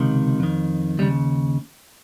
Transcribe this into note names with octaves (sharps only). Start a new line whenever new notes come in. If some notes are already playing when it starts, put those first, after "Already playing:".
Already playing: C#2 C3 D#3
F2 D#3
D#2 C#3 G3